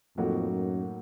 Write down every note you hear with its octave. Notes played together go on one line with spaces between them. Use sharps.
F2 A2 F#3 A#3 D#4 F#4
F#2